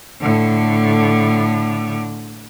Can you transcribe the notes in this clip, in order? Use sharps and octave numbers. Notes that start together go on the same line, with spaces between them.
A2 D3